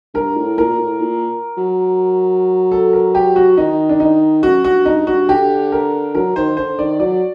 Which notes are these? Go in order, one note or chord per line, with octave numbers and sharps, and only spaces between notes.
G2 A#4
A2
A#2 A#4
A#2
A2
A#2
F#3
A4
A#4
G4
F#4
D#3 D#4
D4
D#4
F#2 F#4
G2 F#4
G2 D#4
G2 F#4
D3 G4
A#4
F#3 A#4
D#3 C5
D3 C5
D#3 D5
F#3 D5